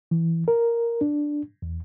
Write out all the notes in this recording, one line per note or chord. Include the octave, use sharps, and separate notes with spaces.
E3
A#4
D4
E2